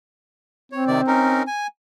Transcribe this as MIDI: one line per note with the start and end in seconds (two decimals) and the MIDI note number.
0.72 1.43 60
0.72 0.84 73
0.88 1.01 48
0.88 1.01 51
0.88 1.01 74
1.07 1.43 61
1.07 1.43 63
1.07 1.43 70
1.47 1.67 80